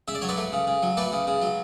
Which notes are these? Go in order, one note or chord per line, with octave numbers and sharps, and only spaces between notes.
C#3 E5
D5
F#3 C#5
B4 D5
A3
C#3
C#3
F#3
A3 B4 D5
C#3
C#3
F#3